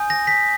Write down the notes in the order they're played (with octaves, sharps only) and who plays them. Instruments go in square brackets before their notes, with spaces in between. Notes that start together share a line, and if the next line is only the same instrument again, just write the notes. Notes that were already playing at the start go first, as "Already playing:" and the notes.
Already playing: [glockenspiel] G#5 D#6 G6
A#6
B6